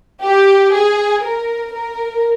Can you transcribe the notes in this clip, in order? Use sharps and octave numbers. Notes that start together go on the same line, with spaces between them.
G4
G#4
A#4
A#4